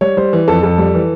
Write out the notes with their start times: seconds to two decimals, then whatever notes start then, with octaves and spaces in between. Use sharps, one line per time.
0.01 G3 C#5
0.17 G3 C5
0.33 E3
0.48 F2 A4
0.63 F2 A4
0.78 G3
0.95 E3